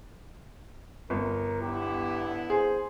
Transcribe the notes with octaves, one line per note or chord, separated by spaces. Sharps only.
G1 A#4
D3 B3 E4 G4
G#4 C5